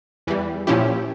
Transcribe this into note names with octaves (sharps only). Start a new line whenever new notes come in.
E2 E3 G3
A#2 F3 C#4 E4 G4